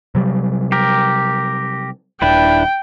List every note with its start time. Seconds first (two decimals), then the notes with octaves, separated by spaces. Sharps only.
0.15 C3 F#3 G3
0.72 G4 A#4
2.22 D#1 D4 E4 B4 G5